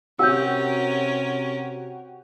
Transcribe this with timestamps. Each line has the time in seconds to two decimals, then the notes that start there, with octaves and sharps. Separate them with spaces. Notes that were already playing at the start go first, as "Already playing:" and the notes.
0.19 C3 C#4 F#4 G4 A#4 E6 G6